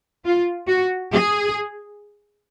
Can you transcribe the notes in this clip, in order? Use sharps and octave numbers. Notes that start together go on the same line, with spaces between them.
F4
F#4
G#4